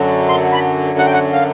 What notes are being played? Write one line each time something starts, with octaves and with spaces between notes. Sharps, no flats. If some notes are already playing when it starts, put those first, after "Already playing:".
Already playing: F#2 D3 F#3
C6
B5
F#5
G5
F#5
F5